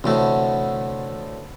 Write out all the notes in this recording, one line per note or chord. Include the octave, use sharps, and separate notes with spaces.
D2 A2 C3 E3 A3 B3 C5